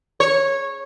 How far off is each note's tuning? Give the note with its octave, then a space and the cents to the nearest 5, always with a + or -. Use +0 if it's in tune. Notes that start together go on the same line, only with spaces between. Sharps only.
C#5 -15